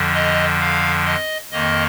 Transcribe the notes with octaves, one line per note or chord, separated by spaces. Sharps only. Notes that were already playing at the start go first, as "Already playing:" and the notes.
Already playing: F2 D3 F3
D#5
F5
D#5
F2 D#3 A#3 D#5